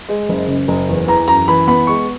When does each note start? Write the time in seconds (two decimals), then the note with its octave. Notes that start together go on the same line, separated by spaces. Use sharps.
0.09 G#3
0.29 F#1
0.48 C#3
0.68 F#1
0.89 E2
1.08 E3 A#5
1.28 F#2 A#5
1.48 E3 B5
1.67 B3 B5
1.87 G#3 C#6